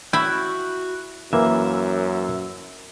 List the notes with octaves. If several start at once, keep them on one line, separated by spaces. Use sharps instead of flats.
E4 F#4 G5 B5
F#2 E3 A#3 E5